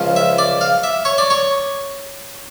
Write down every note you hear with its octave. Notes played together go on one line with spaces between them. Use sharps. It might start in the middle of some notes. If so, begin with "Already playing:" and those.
Already playing: C#2 C#3 F3
E5
D5
F5
E5
C#5
D5
C#5